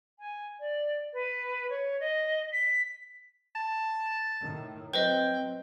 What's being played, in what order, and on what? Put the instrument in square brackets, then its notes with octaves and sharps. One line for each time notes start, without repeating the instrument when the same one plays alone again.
[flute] G#5
D5
B4
C#5
D#5
B6
[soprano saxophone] A5
[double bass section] A2 D#3
[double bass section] F#3 C4 [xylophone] B4 C5 D#5 [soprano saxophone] G5